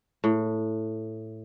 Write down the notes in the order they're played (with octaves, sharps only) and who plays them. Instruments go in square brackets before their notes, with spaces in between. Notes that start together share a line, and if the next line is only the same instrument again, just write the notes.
[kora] A2